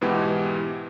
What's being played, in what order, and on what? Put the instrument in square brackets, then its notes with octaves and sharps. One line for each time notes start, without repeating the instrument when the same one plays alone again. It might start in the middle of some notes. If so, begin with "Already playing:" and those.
[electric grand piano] G#2 B2 E3 B3 G4